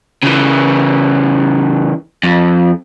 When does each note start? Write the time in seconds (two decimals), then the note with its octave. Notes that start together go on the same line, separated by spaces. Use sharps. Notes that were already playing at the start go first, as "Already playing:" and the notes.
0.23 C#3 E3
2.23 F2